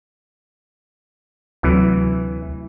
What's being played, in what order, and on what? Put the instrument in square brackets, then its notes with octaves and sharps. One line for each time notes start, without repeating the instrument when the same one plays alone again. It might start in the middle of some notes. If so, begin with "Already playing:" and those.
[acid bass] D2 [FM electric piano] C3 F#3 [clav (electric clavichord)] E3